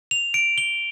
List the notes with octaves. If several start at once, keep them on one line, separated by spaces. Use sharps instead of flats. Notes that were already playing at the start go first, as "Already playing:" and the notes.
F7
D7
G7